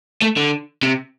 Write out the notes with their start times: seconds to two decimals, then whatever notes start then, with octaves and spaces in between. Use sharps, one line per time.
0.22 A3
0.37 D3
0.83 C3